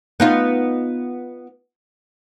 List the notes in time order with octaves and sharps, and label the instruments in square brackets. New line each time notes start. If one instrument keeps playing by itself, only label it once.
[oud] B3 D#4 F4